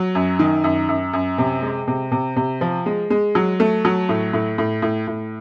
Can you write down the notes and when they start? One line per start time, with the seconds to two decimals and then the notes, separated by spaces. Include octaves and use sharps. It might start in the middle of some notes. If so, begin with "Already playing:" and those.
Already playing: F#3
0.15 F#2
0.39 D#3
0.64 F#2
0.89 F#2
1.13 F#2
1.38 C3
1.62 G#3
1.88 C3
2.12 C3
2.36 C3
2.61 F3
2.86 G#3
3.10 G#3
3.35 F#3
3.60 A3
3.85 F#3
4.09 A2
4.33 A2
4.58 A2
4.82 A2
5.07 A2